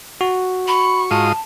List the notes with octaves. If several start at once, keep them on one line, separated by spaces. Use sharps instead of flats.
F#4
B5 C#6
G#2 F4 A5 D#6